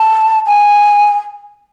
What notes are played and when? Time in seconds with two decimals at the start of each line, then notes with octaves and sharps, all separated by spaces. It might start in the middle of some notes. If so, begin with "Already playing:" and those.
Already playing: A5
0.47 G#5